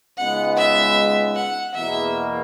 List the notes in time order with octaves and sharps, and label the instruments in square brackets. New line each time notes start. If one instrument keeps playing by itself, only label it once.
[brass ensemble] C#2 C#3 G#3 B3 D#4 [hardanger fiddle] F#5
[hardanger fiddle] E5
F#5
[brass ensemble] E2 B2 A#3 [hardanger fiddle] E5